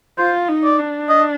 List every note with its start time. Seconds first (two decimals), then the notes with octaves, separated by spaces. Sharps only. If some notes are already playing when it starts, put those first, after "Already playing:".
0.18 F4 C5
0.48 D#4
0.64 D5
0.78 D4
1.09 D#5